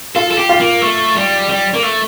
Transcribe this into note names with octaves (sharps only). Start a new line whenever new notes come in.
F4 A4
A4
G4
F4
A#3
A3
G3
G3
A#3
A3